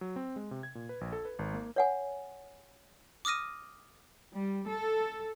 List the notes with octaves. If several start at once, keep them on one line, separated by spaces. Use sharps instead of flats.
F#3
C4
G#3
C3
G#6
A#2
B4
A#1
A4
B4
G#1
A#3
C#5 F#5 G#5
D6 D#6 F6 A#6 D#7
G3
A4